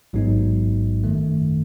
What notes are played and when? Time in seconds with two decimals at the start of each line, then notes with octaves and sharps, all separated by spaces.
0.13 A1 G#2 F#3 B3 D#4
1.04 F#2 D#3 A3